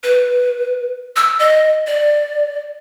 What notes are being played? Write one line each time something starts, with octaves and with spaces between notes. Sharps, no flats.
B4
E6
D#5
D5